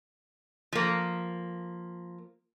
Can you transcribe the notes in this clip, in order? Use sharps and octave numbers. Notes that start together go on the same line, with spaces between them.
F3 A#3